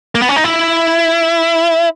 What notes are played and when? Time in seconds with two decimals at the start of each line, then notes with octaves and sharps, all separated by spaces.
0.15 A#3
0.22 B3
0.29 C#4
0.36 D#4
0.44 E4